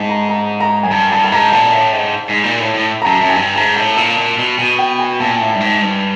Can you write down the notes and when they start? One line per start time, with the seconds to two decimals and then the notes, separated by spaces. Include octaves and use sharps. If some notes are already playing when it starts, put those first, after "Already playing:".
Already playing: G#2 A5
0.09 A#5
0.29 A#5
0.60 A#5
0.83 F#2 G#5
0.91 G2 A5
1.12 G2 A5
1.24 A5
1.32 G#2 A#5
1.52 A#2 A5
1.73 A2
1.92 G#2
2.29 G#2
2.44 A#2
2.60 A2
2.75 A2
3.02 A#5
3.05 F#2 A5
3.21 F#2
3.29 G#5
3.36 G2 A5
3.56 G#2 A#5
3.76 A2 A5
3.97 A#2 A5
4.18 A#2
4.38 B2
4.58 B2 G#5
4.78 G5
4.99 G#5
5.20 A#2 A5
5.41 A2
5.51 G2 A5
5.60 G#2
5.82 G2